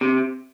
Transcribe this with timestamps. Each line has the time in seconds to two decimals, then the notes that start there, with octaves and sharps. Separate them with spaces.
0.01 C3